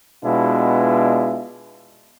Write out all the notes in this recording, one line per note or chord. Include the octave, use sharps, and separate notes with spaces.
B2 G#3 B3 D4 E4 F4